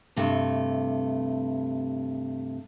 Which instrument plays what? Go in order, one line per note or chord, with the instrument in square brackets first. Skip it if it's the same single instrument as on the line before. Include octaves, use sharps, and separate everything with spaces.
[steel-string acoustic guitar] G2 C3 A3